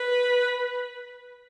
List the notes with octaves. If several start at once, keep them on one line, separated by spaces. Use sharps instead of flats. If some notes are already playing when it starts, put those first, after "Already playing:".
Already playing: B4